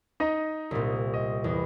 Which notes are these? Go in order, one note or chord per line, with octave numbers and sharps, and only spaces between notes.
D#4 D#5 A#5
C2 A#2
D#5
E2